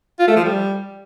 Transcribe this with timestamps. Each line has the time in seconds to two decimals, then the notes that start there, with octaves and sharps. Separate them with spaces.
0.19 F4
0.28 A3
0.36 F3
0.44 G3